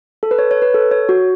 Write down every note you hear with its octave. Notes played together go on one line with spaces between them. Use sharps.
A4
B4
C#5
C#5
B4
A4
C#5
F#4